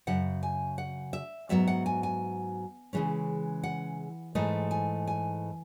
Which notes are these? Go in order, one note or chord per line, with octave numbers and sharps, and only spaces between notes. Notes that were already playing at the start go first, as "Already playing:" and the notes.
F#2 C#3 F#5
G#5
F#5
E5
G#2 F#3 B3 E5
F#5
G#5
G#5
C#3 E3 G#3 C#4
F#5
G#2 E3 A3 D#5
G#5
G#5